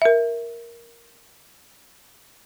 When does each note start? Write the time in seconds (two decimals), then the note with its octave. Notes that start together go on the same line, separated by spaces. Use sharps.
0.02 A#4 E5